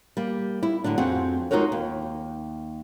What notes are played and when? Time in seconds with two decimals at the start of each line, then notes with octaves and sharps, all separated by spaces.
0.17 G3 A#3
0.63 E4
0.84 A2 D3 F#3 D4
0.98 F2 C4 F#4 G#4 F#5
1.51 G#3 D#4 F4 F#4 A#4 C#5
1.72 D#2